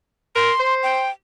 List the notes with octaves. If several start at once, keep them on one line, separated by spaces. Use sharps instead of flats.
A#4 C6
C5
G5